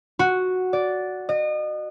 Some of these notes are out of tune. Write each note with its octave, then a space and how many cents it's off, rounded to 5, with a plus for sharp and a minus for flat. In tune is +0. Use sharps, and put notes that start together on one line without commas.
F#4 -5
D5 -10
D#5 -35